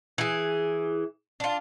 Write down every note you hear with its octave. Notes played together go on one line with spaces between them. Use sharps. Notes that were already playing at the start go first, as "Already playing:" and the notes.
E3 G#4
D4 F4